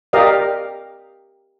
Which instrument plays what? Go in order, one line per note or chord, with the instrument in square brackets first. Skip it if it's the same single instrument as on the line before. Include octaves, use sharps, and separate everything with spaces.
[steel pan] G4 A#4 D5 D#5 F5